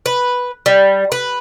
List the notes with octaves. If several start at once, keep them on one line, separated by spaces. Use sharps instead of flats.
B4
G3
B4